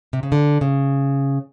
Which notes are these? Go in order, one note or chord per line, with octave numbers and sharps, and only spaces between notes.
C3
C#3
D3
C#3